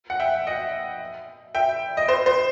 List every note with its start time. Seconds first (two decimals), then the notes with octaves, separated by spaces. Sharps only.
0.10 F#5
0.20 E5 G5
0.47 D#5 F#5
1.55 E5 G5
1.97 D#5
2.08 C5
2.26 C5